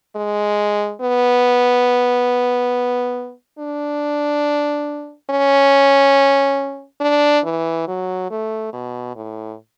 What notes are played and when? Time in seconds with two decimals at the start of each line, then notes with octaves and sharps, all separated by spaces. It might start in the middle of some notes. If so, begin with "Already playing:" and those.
0.16 G#3
1.01 B3
3.59 D4
5.30 C#4
7.01 D4
7.45 E3
7.88 F#3
8.31 A3
8.73 B2
9.16 A2